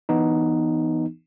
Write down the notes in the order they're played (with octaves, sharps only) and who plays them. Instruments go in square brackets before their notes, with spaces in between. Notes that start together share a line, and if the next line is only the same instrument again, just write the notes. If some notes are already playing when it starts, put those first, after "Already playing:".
[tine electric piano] E3 B3 D#4